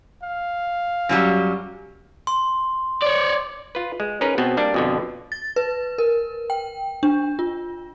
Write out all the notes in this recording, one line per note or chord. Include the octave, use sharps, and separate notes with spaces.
F5
F#2 F#3 G3
C6
C#5 D5
F4 B4
G#3
C#4 D#4 G#4 A#4 B4
B2 B3 C4
G3 A#3 D4
F2 B2 D3
A6
B4
A#4
G5
D4
F4